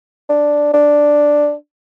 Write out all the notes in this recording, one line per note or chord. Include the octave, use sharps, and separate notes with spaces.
D4
D4